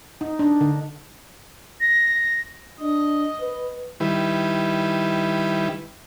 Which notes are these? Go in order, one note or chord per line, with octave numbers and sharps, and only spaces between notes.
D#4
D4
D3
A#6
D4 D#5
B4
D#3 G3 E4 B4